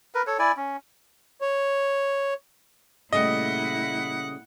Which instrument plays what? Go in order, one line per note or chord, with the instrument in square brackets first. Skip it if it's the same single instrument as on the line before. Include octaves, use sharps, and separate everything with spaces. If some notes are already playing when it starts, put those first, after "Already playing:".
[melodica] A#4 B4
A4 C#5
E4 D5 G#5
C#4
[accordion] C#5
[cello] A#2 E4 [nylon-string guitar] C#3 G3 A3 [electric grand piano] D#5 [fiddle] F#5